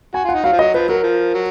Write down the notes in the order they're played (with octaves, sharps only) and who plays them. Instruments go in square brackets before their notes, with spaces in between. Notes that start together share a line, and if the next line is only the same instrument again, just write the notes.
[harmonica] F#4 [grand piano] G#5
[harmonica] F4 [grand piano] F#5
[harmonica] D#4
[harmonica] F#3 [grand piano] F5
[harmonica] F3
[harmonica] F#3 [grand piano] D#5
[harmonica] F3 [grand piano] B4
[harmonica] F#3 [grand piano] A#4
[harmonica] F3
F#3